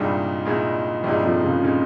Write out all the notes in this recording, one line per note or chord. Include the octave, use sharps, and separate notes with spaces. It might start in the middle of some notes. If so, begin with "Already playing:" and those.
Already playing: C2 G2 A#2 G3 G#3 D#4
C2 A#2 G#3 D#4
C2 G2 A#2 G3 G#3 D#4
F2 F3
C#2 C#3
A#2 C#3 G#3 D#4